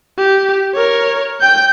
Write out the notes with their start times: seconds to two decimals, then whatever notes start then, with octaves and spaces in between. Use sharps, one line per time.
0.18 G4
0.74 A#4 C#5
1.41 G5 G6